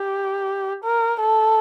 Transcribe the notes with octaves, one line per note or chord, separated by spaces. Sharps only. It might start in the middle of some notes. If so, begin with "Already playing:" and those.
Already playing: G4
A#4
A4